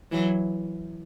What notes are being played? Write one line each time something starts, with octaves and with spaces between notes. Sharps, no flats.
E3 F#3